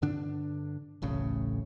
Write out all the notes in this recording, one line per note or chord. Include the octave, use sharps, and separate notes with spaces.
G2 D3 D4
D1 A1 A2 C#3